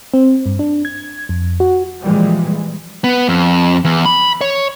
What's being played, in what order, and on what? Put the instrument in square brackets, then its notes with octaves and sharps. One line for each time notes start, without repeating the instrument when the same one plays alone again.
[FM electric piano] C4
G2
D4
G#6
F2
F#4
[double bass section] A#2 E3 F3 G3 G#3
[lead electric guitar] B3
F2
E2
B5
C#5